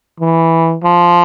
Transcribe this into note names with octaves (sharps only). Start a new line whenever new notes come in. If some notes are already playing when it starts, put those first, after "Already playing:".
E3
F3